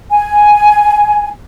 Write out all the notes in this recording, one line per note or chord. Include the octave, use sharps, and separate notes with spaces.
G#5